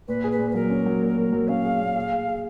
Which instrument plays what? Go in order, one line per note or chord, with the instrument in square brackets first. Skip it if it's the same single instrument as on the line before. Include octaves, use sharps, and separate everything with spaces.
[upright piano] A#2 [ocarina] B4
[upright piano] G#4
[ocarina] B4
[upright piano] A#2
[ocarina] B4
[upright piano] F#3 [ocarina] A#4
[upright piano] C#4
F#3
A#2
F#3
F#3
[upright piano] C#4 [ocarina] F5
[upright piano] G#4
A#2
G#4
G#4
G#4